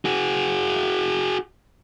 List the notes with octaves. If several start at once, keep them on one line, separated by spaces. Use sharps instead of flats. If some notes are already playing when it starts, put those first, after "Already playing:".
F#4 G#4